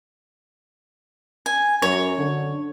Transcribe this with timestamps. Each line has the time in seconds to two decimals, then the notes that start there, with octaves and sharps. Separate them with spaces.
1.46 G#5
1.82 F#2 C#5
2.18 D3